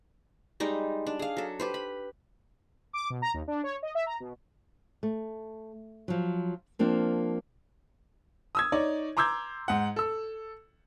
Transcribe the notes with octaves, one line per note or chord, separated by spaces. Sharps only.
G3 G#3 D#4
D4
G#4 F5
F#3 A4
G4 B4 C5
B5
D6
B2
A#5
D#2
D4
C#5
D#5
E5
A#5
B2
A3
F3 F#3
F3 A#3 C4 D4 F4
D#6 E6 G#6
D#4 C#5 D5
A#5 C6 D6 E6 G6 G#6
G#2 F#5
A4 E6